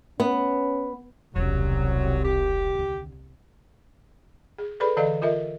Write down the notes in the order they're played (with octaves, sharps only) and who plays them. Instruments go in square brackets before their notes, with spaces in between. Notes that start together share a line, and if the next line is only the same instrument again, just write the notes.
[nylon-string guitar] B3 [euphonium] C#4
[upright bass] E1 C#4 [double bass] C2 C3 [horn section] F#3
[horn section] G4
[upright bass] D#2 D3
[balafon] G#4
G#4 A4 B4 D5 B5
D3 E3 A4 D5 D#5 F5
F4 A#4 D#5 E5